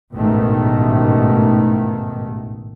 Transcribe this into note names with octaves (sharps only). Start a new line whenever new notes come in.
A1 E2 G#2 B2 D#3 A3